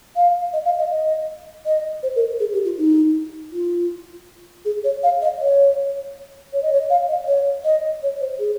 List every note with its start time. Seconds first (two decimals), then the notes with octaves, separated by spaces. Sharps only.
0.16 F5
0.53 D#5
0.65 F5
0.79 D#5
0.90 D#5
1.66 D#5
2.03 C5
2.16 A#4
2.40 G#4
2.53 G4
2.65 F4
2.78 D#4
3.53 F4
4.65 G#4
4.84 C#5
5.03 F5
5.22 D#5
5.41 C#5
6.53 C#5
6.63 D#5
6.73 C#5
6.90 F5
7.08 D#5
7.27 C#5
7.64 D#5
8.03 C#5
8.21 C5
8.39 G#4